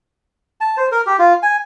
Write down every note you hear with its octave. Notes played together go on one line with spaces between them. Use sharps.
A5
C5
A#4
G4
F4
G#5